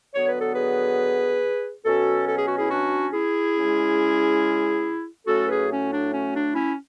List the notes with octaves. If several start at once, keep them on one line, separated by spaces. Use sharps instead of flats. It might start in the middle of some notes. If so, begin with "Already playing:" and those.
D3 F#3 B3 C#5
B4
A4
G#4 B4
B2 F#3 C#4 F#4 A4
A4
G#4
F#4
E4 G#4
D4 F#4
E4 G#4
C#3 G#3 C#4
A2 F#3 A3 C#4 F#4 A4
G#4 B4
C#4
D4
C#4
D4
C#4 E4